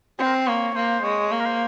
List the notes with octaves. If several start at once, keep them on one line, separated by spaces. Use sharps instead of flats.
C4 C5
A#4
C5
A#3 C#5
A#3 C5
G#3 C#5
A#3
A#4
C5